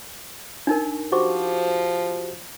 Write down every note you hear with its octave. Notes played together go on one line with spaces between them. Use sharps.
D4 D#4 A#4
F3 F#4 G4 C5 C#6 D6